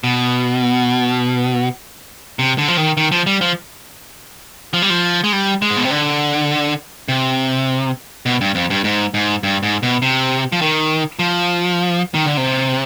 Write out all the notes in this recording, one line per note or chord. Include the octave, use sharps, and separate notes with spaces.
B2
C3
D3
F3
D#3
D#3
F3
G3
F3
F3
G3
F3
G#3
G3
G#3
G#2
B2
C3
D3
C3
B2
G2
F2
G2
G#2
G#2
G2
G#2
B2
C3
F3
D#3
F3
D#3
D3
C3